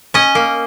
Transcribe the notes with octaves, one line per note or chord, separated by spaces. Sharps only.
C#4 D#5
A#3